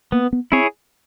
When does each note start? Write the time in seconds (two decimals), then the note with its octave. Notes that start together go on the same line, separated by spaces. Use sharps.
0.12 A#3 B3
0.33 B3
0.52 C4 E4 G#4 C#5